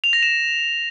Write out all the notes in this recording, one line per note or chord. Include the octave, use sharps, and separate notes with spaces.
F7
A#6
E7